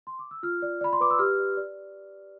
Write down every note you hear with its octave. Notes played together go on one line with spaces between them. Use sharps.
C6
D6
E6
F4 F6
D5
D5 B5
C6
B4 D6
E6
G4 F6
D5
D5